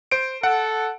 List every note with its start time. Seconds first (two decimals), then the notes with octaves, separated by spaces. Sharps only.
0.12 C5 D7
0.43 A4 F#5